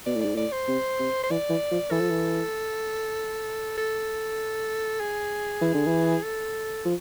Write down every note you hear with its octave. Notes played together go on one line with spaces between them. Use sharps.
B2 D5
A2
G#2 D5
A2 D5
C5
C3
C3
C5
E3 D5
E3
F3
E3 A4
F3
E3
A4
G#4
E3
D3
E3
A4
F3